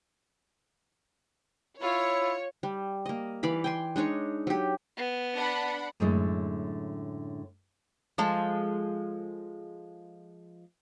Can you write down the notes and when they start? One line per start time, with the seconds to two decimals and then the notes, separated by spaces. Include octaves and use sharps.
1.82 E4 F4 C#5
2.63 G3
3.06 A#3 D#5
3.43 E3 D5 F5 B5
3.64 G5 G#5 C6
3.96 G#3 D4 D#4 C#5
4.47 F#3 G4
4.97 B3
5.35 D4 F#5 B5
6.00 F#2 A2 D3 G#3 G#4 D#5
8.18 F3 G#3 A4